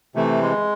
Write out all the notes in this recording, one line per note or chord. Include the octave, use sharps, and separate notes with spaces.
C3 E3 A3
G#3